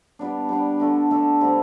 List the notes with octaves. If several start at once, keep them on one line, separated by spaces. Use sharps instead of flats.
G3 B3 D4
G3 B3 D4
D3 A3 D4 A4
D3 A3 D4 A4
C3 G3 C4 E4